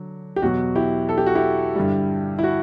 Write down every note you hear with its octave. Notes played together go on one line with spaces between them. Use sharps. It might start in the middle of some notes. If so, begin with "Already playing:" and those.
Already playing: D3 F#3
G4
E2 B2 F#3 F#4
E4 G4
A4
G4
F#4
E4 G4
G2 D3 G3
E4
F#4